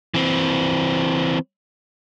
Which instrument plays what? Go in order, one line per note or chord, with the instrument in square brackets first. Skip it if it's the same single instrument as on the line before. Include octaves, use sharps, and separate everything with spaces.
[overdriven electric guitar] E3 C4